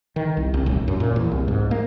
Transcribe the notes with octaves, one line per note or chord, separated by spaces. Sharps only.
D#3
C2
C2
D#1
F#2
A#2
E2
C2
G#2
A#3